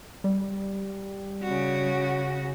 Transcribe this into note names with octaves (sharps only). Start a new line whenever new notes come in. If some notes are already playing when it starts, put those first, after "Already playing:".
G3
C#3 F#4